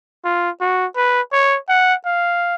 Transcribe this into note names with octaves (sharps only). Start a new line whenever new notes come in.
F4
F#4
B4
C#5
F#5
F5